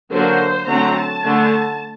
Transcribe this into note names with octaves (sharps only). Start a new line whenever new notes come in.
D3 F#3 A#3 D4 C5
D3 F#3 A3 C4 A#5
A5
D3 A3 D4